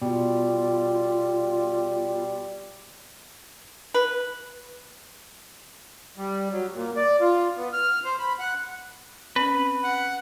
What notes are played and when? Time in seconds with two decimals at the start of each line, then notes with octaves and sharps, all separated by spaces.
0.02 B2 G3 F4
3.94 B4
6.17 G3
6.52 F#3
6.75 A#2
6.97 D5
7.21 F4
7.57 B3
7.73 F6
8.04 C5
8.19 B5
8.39 F#5
9.36 C4 C#4 B4
9.84 F#5